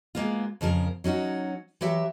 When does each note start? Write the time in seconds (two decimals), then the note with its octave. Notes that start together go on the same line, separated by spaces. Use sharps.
0.15 G#3 A#3 B3 F4
0.61 F2 C#3 F3 A#4
1.04 F#3 C#4 D#4 F#4
1.81 E3 F#3 G4 E5